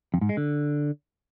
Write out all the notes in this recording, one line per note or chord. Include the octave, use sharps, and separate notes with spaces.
F2
G#2
G#3
D3